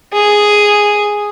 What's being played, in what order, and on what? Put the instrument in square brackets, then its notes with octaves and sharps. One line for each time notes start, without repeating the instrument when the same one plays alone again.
[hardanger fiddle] G#4